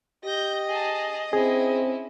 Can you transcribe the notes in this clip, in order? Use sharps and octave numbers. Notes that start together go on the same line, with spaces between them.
G4 D#5 G6 A#6
G#4 A5
C4 C#4 E4 G#4